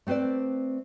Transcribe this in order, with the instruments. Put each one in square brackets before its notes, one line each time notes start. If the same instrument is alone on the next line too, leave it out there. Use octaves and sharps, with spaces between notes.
[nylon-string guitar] A3 C4 B4 C5 D5